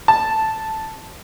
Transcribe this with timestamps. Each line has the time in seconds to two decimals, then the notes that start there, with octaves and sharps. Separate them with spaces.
0.08 A5